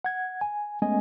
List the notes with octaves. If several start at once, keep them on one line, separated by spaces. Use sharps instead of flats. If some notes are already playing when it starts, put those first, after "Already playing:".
F#5 G#6
G#5
G#3 A3 B3 C#4 D#5 G#5